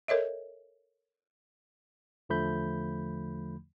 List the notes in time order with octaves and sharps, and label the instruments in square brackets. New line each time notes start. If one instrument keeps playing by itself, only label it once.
[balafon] A4 A#4 C#5 D#5 E5
[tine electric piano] E2 D3 F3 A3 B5 G6